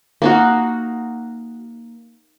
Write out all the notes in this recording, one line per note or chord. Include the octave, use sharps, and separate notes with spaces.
A#3 D#4 F#4